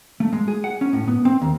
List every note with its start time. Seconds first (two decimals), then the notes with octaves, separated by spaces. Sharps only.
0.20 A3
0.33 G#3
0.48 G#4
0.64 F#5
0.81 C#4
0.93 A2
1.08 B3
1.25 C4
1.42 D#2